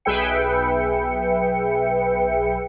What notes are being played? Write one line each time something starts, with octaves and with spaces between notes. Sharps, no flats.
B1 G#4 B4 E5 G5 C#7